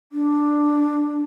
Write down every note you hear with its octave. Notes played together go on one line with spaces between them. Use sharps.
D4